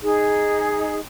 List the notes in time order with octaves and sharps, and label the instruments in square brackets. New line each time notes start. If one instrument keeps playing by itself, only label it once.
[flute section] D#4 G#4